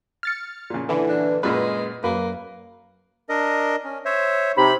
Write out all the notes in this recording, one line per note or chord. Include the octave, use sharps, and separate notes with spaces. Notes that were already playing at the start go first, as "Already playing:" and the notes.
F6 A6 C#7
A#2 C#3
D3 E3
D4
F#2 A#2 G#3 B4
F#2 A#3 B4
D4 A#4 D#5
C#4
C5 C#5 E5
C3 D#4 B5